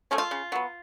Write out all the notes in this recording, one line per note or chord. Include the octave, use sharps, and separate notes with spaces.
F3 A3 C#4
F4
C#3
F#3 B3